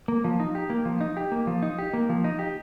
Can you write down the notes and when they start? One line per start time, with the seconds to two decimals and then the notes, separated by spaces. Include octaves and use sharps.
0.08 A#3
0.24 F3
0.40 D#4
0.55 G4
0.70 A#3
0.85 F3
1.01 D#4
1.17 G4
1.32 A#3
1.47 F3
1.62 D#4
1.78 G4
1.93 A#3
2.09 F3
2.24 D#4
2.39 G4